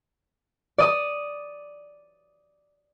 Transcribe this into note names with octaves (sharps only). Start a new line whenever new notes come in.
D5 D#6